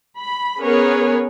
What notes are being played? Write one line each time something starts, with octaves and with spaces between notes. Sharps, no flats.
B5
B3 C#4 G#4 A#4 B4 C#5